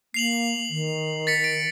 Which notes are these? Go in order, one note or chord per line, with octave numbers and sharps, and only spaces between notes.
A#3 C7 F7 F#7
D#3
A6 B6 C#7
D7